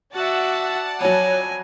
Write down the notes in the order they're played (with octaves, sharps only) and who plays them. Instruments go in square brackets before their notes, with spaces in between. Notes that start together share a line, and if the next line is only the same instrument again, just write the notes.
[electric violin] F#4 E5 [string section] D5 F#5 A5
[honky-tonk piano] F2 F#3 [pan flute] C#5 [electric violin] G#5